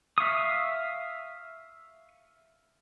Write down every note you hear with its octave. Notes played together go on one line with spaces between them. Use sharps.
E5 F5 C#6 D#6